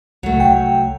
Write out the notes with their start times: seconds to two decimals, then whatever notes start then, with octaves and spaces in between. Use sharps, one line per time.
0.23 C#2 F#3 A3
0.40 C2 G5